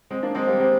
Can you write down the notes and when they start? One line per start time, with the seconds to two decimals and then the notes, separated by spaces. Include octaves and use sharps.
0.11 G#3 C4
0.23 A#3 D4
0.35 G#3 C4
0.47 G3 A#3
0.60 G#3 C4